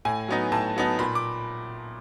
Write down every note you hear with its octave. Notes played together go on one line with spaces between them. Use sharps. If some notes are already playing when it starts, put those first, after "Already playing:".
A2 G#5
F#3 B3 D#4
A2 A5
F#3 B3 D#4
A#2 B5
D6